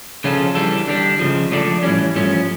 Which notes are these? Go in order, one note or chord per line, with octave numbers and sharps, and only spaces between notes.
C#3 F3 C#4 F4 A4
E3 G3 D4 A4
D3 G3 D4
C#2 C#3 F3
F3 A3 D4 A4 D5
A2 E3 G3 C#4
G2 F3 A3 C#4